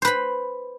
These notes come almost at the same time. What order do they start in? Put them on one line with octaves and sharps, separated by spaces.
C5 B4 B5